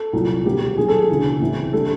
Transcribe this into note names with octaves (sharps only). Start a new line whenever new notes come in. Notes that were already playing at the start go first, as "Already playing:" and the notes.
Already playing: A4
C2 A#2 F#3
E1 D2 D3 G3 G4
D#2 D#3 F#3 G#4
A4
G#4
E1 D2 C#3 E3
C2 C3 E3
D3 G3 A4